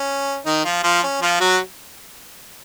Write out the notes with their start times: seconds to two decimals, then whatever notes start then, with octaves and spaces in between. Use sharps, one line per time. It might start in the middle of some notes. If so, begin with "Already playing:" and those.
Already playing: C#4
0.46 D#3 D#4
0.64 F3 F4
0.83 F3 F4
1.04 C#4
1.22 F3 F4
1.41 F#3 F#4